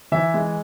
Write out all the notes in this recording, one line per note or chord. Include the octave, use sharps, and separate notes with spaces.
E3 E5
G#3